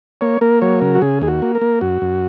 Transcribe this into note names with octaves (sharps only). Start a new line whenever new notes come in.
A#3 C#5
A#3 A#4
F#3 C#5
C#3 A#4
F#4
C#3 G#4
D#2 G#4
F#4
A#3
A#4
A#3
F#2 F#4
F#2